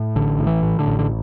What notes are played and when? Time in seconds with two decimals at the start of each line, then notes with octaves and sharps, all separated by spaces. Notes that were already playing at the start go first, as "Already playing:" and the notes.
Already playing: A2
0.16 A1 D3
0.39 A2
0.47 E3
0.63 A2
0.79 D3
0.87 A1
0.99 D3